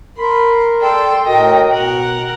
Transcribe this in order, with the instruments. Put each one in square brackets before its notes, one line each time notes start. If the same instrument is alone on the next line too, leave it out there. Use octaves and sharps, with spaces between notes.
[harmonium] A#4 [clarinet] B5 [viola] C6
[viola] A4 C6 [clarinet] D5 [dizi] G5
[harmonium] A2 A#4 [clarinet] F#4 [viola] D#5
[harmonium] B2 [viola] A#4 F#5